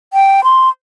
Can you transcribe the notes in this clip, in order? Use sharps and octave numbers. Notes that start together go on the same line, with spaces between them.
G5
C6